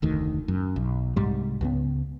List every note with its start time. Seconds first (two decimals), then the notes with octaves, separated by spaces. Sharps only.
0.02 F1 D2 D#3
0.48 F#2
0.76 B1
1.16 C2 G#2 G3
1.61 C#2 F3 B3